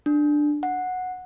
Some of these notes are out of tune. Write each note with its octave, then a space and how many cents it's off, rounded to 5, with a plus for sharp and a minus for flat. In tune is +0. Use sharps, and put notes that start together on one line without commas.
D4 +10
F#5 -10